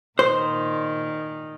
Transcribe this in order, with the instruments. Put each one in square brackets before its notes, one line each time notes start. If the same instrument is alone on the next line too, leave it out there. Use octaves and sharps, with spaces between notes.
[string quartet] A#2 D#3 [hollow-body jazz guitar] C5